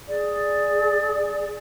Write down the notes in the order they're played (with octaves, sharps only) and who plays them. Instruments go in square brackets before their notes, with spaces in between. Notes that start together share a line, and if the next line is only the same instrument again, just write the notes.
[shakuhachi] G#4 [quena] D5